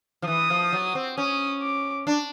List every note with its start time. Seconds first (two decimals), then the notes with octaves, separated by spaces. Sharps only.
0.22 F3
0.27 E3 D#6
0.50 F3
0.72 F#3
0.95 C4
1.18 C#4 D#6
1.62 D6
2.07 D4